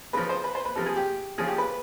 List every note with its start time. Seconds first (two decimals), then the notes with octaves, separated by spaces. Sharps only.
0.13 C#3 F3 B4
0.29 C5
0.44 B4
0.55 C5
0.65 B4
0.76 C3 F3 A4
0.86 G#4
0.96 G4
1.38 C#3 F3 G#4
1.48 G4
1.58 B4